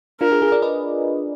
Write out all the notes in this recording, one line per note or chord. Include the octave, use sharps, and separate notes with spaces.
D4 F4 A#4
F4 G#4
F4 G#4
A#4 D5
B4 D#5